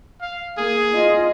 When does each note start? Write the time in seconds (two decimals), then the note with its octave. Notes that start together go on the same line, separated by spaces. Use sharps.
0.21 F5
0.58 A#3 G#4
0.94 F4 D#5